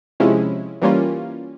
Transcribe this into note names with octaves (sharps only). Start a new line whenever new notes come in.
C3 F3 G#3 C#4 E4
E3 G3 A#3 C#4 F4